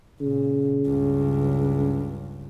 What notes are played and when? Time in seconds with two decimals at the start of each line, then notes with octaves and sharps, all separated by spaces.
0.21 A#2 C#3
0.86 C#2 G2